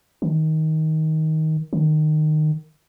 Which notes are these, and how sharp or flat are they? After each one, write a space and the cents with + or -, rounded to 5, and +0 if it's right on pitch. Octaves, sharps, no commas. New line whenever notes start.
D#3 +15
D#3 -20